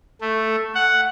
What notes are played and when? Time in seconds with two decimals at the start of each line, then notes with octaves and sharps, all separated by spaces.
0.21 A3
0.75 F#5